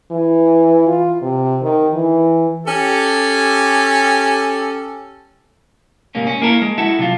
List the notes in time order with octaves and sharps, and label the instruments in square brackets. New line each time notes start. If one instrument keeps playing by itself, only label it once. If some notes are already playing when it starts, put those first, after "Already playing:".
[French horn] E3
F4
C3
D#3
E3
[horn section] C#4 G4 A4
[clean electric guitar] G#2 C3 A#3 C#4
C#4
A#3 E4 A4 A#4
G#3
E4 F#4 A4 E5
C3 F#3 F4